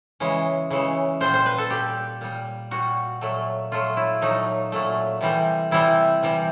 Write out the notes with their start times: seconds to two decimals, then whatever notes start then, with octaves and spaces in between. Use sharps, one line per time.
0.20 C#3 E3 G#3
0.71 C#3 E3 G#3
1.21 A#2 G3 C5
1.34 C5
1.46 B4
1.58 A4
1.70 A#2 G3 G4
2.21 A#2 G3
2.71 A#2 G3 F#4
3.21 A#2 F#3 A3
3.72 A#2 F#3 A3 F4
3.97 E4
4.21 A#2 F#3 A3 D#4
4.72 A#2 F#3 A3
5.21 C3 E3 G3
5.71 C3 E3 G3 E4
6.23 C3 E3 G3